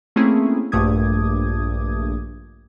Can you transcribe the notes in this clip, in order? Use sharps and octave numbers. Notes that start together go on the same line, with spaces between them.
A3 A#3 C4 C#4 E4 G#4
A#1 G2 A3 D6 D#6 G#6